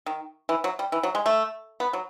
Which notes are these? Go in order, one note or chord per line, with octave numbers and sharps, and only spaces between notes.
D#3
E3
F#3
G3
E3
F#3
G#3
A3
B3
F#3